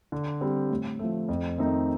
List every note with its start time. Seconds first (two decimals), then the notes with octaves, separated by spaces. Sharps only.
0.12 D3
0.41 G3 C4
0.70 A2
0.99 F3 A3
1.29 F2
1.58 D#3 A3 C4 D#4